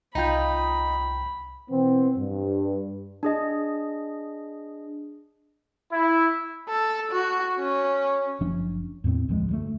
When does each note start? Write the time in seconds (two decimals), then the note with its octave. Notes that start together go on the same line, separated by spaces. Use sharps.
0.15 C2 D#4 F4 G5 B5 G6
1.70 B2 E3 B3 C4
2.17 G2
3.23 D4 G#4 D#5
5.91 E4
6.69 A4
7.12 F#4
7.59 C#4
8.41 F#1 F3 C#4 D4
9.04 E2 A2 A#3 C4
9.29 C#2 G2 F3 G#3
9.49 D2 F#3 A3